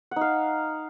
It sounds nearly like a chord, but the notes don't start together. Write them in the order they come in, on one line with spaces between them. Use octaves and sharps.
F#5 D#4 F5